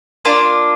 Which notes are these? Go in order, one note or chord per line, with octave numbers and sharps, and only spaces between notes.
A#3 D4 F4